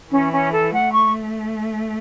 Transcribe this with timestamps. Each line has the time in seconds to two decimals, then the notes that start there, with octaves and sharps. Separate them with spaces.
0.11 E3 C#4
0.32 C#4
0.52 A4
0.71 A3 F#5
0.92 C#6